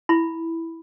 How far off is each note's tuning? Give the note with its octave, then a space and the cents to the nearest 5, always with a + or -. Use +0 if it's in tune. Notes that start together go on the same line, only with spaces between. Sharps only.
E4 +0 B5 +0